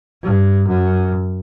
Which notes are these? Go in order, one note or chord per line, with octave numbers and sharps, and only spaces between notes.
G2
F#2